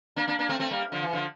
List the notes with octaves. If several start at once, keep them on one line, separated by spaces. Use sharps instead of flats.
A#3 D4
A#3 D4
A#3 D4
A3 C4
A3 C4
G3 A#3
D3 F3
E3
D3 F3